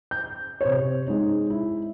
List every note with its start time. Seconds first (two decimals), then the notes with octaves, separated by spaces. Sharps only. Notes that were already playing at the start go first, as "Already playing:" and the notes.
0.11 G6
0.61 C3 C5 C#5
1.08 G#3 D#4
1.50 E4